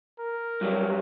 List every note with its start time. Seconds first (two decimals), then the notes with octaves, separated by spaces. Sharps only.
0.19 A#4
0.61 G2 F#3 G3